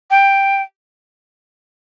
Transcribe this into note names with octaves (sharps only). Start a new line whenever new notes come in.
G5